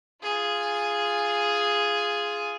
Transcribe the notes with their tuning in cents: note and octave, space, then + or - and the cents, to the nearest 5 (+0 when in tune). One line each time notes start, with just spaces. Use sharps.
F4 -5 G#4 +0